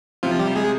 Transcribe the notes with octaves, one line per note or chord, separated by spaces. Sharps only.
C3 F3 F4
G3 G4
G#3 G#4